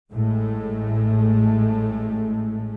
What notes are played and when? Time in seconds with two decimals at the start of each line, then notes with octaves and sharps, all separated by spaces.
0.10 A1 A2 G#3 A3